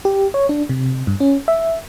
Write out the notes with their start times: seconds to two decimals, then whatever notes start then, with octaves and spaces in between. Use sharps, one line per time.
0.05 G4
0.34 C#5
0.49 D4
0.69 C3
1.07 G2
1.20 C#4
1.48 E5